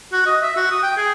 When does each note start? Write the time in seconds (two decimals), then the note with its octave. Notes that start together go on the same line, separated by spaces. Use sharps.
0.13 F#4
0.26 D#5
0.42 E5
0.56 F#4
0.71 D#6
0.83 G5
0.97 G#4